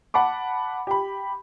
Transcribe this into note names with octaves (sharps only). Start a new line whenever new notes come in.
F#5 A5 B5 D6
G4 B5